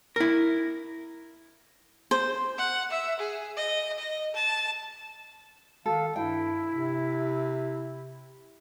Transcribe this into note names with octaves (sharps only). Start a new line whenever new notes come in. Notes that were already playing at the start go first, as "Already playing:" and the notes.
E4 A#4
C5
F#5
E5
G#4
D#5
D#5
A5
D#3 A4 F5
G2 E4 G5
C3